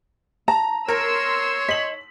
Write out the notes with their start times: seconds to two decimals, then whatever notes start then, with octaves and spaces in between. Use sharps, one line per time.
0.48 A5 A#5
0.88 A#4 C#5 C6 E6
1.69 D#5 B6 F#7